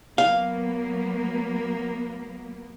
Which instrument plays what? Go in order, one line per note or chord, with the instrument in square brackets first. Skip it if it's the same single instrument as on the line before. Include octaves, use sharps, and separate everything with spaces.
[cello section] F#3 A#3 B3 [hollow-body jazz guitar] F5